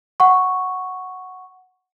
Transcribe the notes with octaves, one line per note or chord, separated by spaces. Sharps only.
F#5 C#6